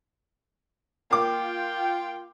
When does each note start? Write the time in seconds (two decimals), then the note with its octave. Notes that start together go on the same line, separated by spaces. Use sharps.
1.11 A#3 F4 G5 D6